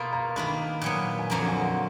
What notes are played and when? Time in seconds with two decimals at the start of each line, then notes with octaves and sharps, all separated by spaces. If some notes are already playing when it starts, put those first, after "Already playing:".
Already playing: B2 A#3 F4 B5
0.13 A#5
0.36 D#3 A#3 D4 B5
0.82 A#2 F#3 B3
1.19 G#5
1.30 F2 D3 F#3 A#3 A#5
1.48 G#5
1.54 F#5